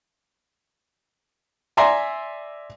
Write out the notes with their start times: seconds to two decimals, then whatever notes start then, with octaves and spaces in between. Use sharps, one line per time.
1.77 D5 E5 G#5 A#5 C6